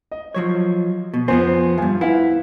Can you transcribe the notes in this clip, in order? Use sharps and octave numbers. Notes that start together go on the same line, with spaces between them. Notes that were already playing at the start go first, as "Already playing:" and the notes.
D#5
F3 F#3 C#5
B2
F2 F3 B3 C4 C5 G#5
E2 G2 F4 F5 G#5
E4 B4 F5 F#5